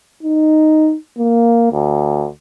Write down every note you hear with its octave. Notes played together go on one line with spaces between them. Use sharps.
D#4
A#3
D2